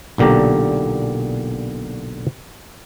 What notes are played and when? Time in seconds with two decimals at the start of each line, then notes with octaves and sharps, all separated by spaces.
0.18 B1 A#2 D3 G4 A#5